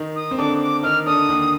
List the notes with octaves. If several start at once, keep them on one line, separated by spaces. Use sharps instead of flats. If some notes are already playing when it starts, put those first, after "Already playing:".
Already playing: D#3 D#4
D#6
C4
D3 D4 D6
D6
D#3 D#4 F6
D3 D4 D#6
D#2 D#3